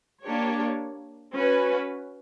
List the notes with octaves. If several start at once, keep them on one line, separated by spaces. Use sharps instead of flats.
A#3 D4 G4 C#5
C#4 F#4 B4